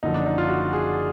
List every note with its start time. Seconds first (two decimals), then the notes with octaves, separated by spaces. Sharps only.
0.03 F#1 F#2 D3 F3 D#4
0.14 D4
0.26 D#4
0.38 F4
0.49 F#4
0.73 G#4